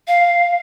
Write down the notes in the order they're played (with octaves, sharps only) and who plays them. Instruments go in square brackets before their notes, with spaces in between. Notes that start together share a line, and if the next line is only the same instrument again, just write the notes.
[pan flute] F5